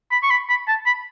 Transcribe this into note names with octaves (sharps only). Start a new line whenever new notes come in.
B5
C#6
B5
B5
A5
B5